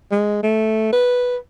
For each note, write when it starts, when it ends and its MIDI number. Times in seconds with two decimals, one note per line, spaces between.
0.11 0.40 56
0.43 0.91 57
0.93 1.37 71